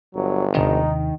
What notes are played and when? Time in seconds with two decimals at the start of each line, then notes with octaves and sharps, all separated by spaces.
0.15 G1 F#3
0.55 D#2 C3 D#3 D4 D#4